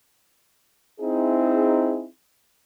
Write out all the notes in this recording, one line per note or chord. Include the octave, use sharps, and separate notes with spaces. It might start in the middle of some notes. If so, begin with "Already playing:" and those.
C4 D#4 E4 G#4